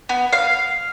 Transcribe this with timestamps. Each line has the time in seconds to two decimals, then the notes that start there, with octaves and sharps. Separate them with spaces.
0.09 B3
0.33 F5